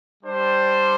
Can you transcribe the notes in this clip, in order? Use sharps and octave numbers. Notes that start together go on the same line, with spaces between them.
G3 D4 G4 C5